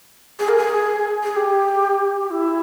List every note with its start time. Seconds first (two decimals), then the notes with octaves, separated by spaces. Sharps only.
0.39 G#4
0.49 A#4
0.57 G#4
1.23 G#4
1.36 G4
2.22 G4
2.31 E4